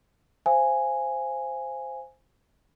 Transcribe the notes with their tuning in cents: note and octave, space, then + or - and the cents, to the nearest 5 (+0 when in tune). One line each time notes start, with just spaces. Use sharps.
C5 +0 F5 -25 G#5 -5